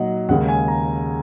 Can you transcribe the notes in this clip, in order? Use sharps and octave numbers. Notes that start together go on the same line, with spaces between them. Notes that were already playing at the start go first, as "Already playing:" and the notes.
Already playing: A#2 F#3 D#4 D#5 F#5
D#2 C#3 G#3 F#5
G#5
A#5